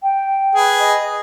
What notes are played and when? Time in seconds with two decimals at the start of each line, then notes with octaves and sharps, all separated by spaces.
0.03 G5
0.55 G#4 B4
0.80 D#5